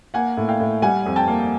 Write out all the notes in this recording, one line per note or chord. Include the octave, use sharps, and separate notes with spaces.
A#3 F#5 G#5
A2
F5 G5
A2
G3 F#5 G#5
F2
G5 A5
A#3